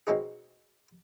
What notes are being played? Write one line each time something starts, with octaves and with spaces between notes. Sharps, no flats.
B2 G#3 C4 C#4 D#4 G#4